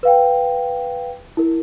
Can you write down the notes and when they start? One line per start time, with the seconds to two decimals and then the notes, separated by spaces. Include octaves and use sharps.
0.03 B4 F5 G5
1.37 E4 A#4